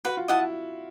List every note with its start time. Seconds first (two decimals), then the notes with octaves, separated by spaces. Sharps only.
0.05 F#4 B4
0.17 F4
0.28 E4 D#5 F#5 A5